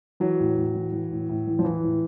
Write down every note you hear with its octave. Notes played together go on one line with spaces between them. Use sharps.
E3 F#3
A2
A2
E3
E3
A2
A2
E3
F3
E3
A2